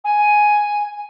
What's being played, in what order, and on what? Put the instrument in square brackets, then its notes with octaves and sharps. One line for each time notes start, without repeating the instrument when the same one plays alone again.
[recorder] G#5